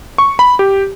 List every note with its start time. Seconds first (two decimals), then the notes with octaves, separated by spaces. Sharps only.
0.18 C#6
0.39 B5
0.59 G4